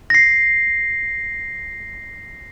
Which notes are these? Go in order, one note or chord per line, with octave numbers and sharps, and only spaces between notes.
A#6 C7